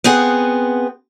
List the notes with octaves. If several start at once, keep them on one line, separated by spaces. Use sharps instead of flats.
B3 C4 G#4 F#5